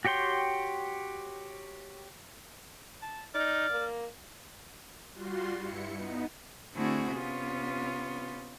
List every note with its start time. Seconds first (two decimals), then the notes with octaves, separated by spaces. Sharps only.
0.05 F#4 G4 C#5 G5 C6
3.02 A5
3.35 D#4 D5 F6
3.70 A#3
5.14 G3 F4 F#4 C6
5.58 G2 E4 C#7
5.92 B3 D#4
6.75 D3 A3 C4 E4 F#4 G#4
7.13 C3 B3 C#4 F4